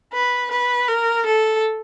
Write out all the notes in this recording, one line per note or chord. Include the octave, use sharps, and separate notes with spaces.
B4
B4
A#4
A4